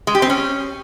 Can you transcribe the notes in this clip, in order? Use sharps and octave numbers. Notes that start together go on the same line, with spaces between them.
G#3
G4
C4
C#4